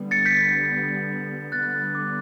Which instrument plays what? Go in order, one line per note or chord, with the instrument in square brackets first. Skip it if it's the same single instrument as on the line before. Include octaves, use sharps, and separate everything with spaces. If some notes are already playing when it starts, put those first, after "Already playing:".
Already playing: [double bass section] D3 G3 B3
[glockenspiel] A6 C#7
G6 B6
[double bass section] D3 G3 B3 [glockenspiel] F#6 A6
[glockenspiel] D6